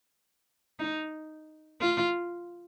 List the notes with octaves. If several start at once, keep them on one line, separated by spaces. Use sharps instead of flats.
D#4
F4